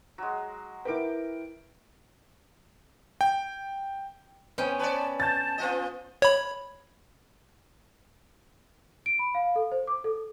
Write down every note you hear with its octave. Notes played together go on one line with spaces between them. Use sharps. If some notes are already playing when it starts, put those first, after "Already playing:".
F#3 G#3
E4 A#4 B4 G5 D6
G5
B3 C#4 C5 G5 G#5
B4 C#5 D5 A5
A5 G6 A6
B3 F4 D#5
C#5 B5
D7
B5
F5
A4
C5
D6
A4